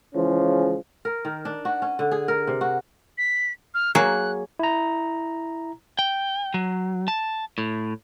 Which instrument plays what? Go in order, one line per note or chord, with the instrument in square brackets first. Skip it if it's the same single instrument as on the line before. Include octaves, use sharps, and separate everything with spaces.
[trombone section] C#3 E3 F3 G#3 C#4
[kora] A#4
D#3
D4
F#4
C#4
D3
G#4
A#4
C3
F#4
[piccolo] B6
F6
[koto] F#3 A#3 G#4 [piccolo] F#6
[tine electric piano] E4 A#5
[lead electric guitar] G5
F#3
A5
A2